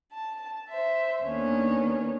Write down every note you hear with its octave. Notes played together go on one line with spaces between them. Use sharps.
A5
C5 E5
D#2 D#3 B3 C#4 D4